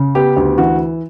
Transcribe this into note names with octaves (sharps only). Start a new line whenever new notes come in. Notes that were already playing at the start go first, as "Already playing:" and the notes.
Already playing: C#3
B3 G4
D2 G4
E3 F#4